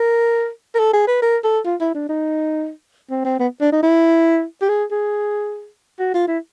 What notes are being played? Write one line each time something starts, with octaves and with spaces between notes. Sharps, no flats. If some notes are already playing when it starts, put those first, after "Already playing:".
Already playing: A#4
A#4
A4
G#4
B4
A#4
A4
F4
E4
D4
D#4
C4
C4
B3
D4
D#4
E4
G4
G#4
G#4
F#4
F4
E4